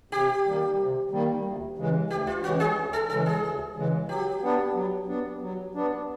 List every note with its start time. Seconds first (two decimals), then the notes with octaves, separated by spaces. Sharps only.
0.11 C3 G4
0.46 D#3 G3 A#3
0.78 C3
1.11 D#3 G3 A#3
1.45 D2
1.77 C#3 E3 G#3
2.10 D2 G4
2.27 F4
2.43 C#3 E3 G#3 F#4
2.60 G#4
2.76 D2
2.93 A4
3.09 C#3 E3 G#3 A4
3.26 G#4
3.43 D2
3.76 C#3 E3 G#3
4.09 F#3 G4
4.42 B3 D4
4.74 F#3
5.08 B3 D4
5.41 F#3
5.75 B3 D4